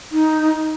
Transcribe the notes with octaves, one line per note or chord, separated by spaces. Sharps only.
D#4